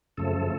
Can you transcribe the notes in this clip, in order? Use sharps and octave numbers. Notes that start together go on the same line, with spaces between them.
F#2 C#3 F3 A3 A4